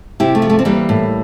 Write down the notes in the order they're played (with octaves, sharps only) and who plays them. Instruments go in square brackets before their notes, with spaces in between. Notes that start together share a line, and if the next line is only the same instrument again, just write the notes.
[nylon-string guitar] C3 E4 G4
A3
F3
A3
C4
E3 G3 A#3
A2